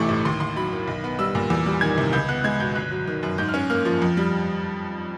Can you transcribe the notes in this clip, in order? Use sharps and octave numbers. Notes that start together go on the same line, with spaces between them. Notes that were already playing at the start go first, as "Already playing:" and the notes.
Already playing: A1 C3 E3 A3 C#6 D6
A2
D#2 C6
D#2 C6
F#3 B5
D#3
B1
B3
G3 E6
A#2
E2
G3
D#3 G#6
C3
C#2 G6
B3 F#6
G#3 G#6
B2 G6
G1 F#6
F#3
D#3
F#2
G#2 G6
F6
C#4
A#3 F6
F3
F2
G3